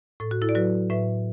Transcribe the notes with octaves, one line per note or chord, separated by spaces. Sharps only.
A2 A4
F#4
E4 A4
D5
F#3 F#4 B4
A2 B4 E5